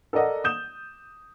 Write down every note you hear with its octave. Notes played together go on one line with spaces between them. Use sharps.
A4 A#4 D5 D#5 F#5
D#6 G6 E7